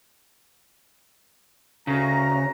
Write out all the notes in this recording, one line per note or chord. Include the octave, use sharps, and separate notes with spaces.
D2 C#3 F#4 A#5